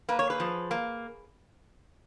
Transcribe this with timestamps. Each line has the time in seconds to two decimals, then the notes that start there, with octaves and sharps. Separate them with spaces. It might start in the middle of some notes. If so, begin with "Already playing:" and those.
0.09 A#3 B4
0.19 C#5
0.30 G#4 B4
0.40 F3
0.71 A#3